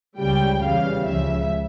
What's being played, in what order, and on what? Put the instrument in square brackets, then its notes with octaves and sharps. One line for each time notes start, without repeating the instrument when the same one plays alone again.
[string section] C#2 C#3 G3 G5
E2 C#3 E3 G3 F5
C#2 C#3 F3 E5